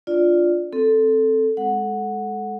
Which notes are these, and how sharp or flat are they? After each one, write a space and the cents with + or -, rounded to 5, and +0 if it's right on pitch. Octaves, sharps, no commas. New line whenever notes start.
D4 +0 F4 +0 D5 +0
C4 +0 A4 +0
G#3 +0 A4 -10 F#5 -5